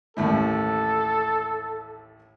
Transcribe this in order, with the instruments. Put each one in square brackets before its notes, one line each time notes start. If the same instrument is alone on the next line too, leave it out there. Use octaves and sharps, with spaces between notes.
[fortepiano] A1 D#2 A2 [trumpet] A4